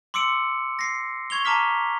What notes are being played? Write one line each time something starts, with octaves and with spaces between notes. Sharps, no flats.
C6 D6 E6 C#7 D7
A#6 C7
C#6 G#6 F7 G7
A5 A#5 D6 F6 B6